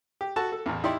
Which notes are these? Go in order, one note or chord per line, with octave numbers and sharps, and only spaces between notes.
G4
F#4 A4 A5
A4
A1 E2
D#4 E4 G4 D5 C6